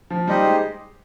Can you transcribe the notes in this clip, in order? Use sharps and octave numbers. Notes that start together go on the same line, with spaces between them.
F3
G3 D#4 G4 C5 D#5
G#3